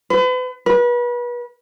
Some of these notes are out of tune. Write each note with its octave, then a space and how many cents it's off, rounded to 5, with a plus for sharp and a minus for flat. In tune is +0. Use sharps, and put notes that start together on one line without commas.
B4 +40
B4 -35